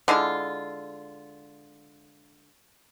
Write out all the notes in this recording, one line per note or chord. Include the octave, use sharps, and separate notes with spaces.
D3 G#3 E4 F4